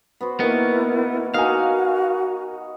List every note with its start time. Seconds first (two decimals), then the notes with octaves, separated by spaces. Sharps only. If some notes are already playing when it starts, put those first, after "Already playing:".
0.21 B3 F#4 C5
0.40 D#3 A#3 B3 E4 A#4 C#6
1.34 D#4 F#4 A#4 F5 F#5 G#5 D6